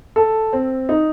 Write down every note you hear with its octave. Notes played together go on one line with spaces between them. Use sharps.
A4
C4
D#4